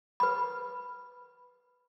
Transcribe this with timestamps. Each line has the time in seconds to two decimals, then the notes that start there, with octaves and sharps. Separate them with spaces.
0.20 B4 B5